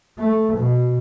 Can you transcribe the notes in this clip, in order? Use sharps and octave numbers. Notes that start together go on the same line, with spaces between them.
A3
B2